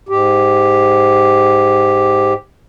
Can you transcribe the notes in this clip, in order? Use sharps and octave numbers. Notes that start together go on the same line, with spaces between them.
G#2 G4